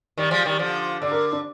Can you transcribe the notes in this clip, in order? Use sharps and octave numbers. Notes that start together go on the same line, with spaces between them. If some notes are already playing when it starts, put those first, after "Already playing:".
D#3 G3 D5
F3 G#3
D#3 G3
D3 F3
D3 D5
A#4
D4